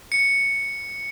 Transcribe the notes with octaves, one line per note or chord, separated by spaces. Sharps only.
C#7